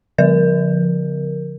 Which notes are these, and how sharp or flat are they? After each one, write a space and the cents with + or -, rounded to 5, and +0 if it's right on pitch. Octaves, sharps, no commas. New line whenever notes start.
D3 -40 F3 +10 A#4 +0